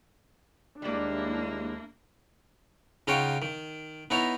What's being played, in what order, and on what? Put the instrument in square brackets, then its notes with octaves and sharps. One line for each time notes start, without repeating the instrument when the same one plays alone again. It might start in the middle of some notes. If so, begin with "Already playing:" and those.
[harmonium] D#2 G#3 [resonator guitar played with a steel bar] G3 D5 [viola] A#3 [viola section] D4 E4
[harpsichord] C#3 D#4 F4 C#5 F#5 G5
D#3
B3 D#4 E4 C#5 A#5